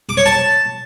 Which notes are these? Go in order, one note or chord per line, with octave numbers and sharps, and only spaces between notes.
D6
C#5
A5